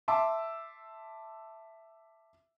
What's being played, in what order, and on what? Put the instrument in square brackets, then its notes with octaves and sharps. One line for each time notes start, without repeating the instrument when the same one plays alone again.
[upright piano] E5 A5 C6 D6 E6